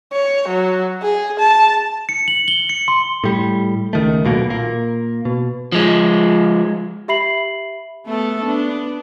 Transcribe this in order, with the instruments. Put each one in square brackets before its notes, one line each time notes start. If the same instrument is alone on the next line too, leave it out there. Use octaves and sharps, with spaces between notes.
[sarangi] C#5
F#3
G#4
A5
[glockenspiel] C#7
F#7
G7
C#7
C6
[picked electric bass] A2 G3
C#2 D#3 A3
D#1 B1 B2 A#3
A#2 A#3
B2
[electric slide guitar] F3 G#3
[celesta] G4 E5 B5 C7 F#7
[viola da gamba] A3 B3 A4
B3 D4